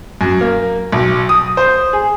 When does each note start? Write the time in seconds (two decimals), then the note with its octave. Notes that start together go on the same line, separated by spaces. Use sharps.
0.21 F#2
0.41 A#3
0.92 B1
1.29 D#6
1.57 C5
1.93 G#4